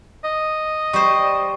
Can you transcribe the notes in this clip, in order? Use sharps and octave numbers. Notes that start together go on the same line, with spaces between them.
D#5
G3 C5 C#6